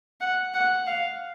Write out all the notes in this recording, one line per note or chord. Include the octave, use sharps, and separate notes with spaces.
F#5
F#5
F5